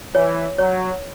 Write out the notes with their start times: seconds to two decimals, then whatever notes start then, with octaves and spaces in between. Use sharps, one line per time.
0.15 E3 C#5
0.58 F#3 C#5